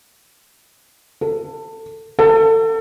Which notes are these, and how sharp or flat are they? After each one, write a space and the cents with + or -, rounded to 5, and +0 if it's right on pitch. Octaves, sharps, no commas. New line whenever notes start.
A4 +20
A4 +30